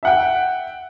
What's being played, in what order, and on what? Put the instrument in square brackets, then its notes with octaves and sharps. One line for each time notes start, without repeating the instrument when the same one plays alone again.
[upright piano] E5 F#5 G5